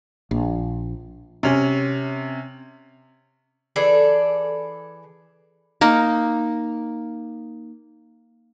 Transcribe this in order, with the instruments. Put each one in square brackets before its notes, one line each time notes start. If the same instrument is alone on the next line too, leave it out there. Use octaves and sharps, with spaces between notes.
[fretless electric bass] A#1
[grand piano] C3 C#4
[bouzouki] E3 G#4 A4 D5
[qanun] A#3 D#4